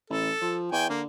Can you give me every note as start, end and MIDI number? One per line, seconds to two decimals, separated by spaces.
0.10 0.30 33
0.10 0.60 69
0.41 0.70 53
0.72 0.85 40
0.72 0.86 79
0.72 0.86 80
0.89 1.06 50
0.89 1.01 58